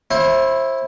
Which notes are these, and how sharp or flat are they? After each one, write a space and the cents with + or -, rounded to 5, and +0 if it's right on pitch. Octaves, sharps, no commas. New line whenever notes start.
E4 +0 C5 +30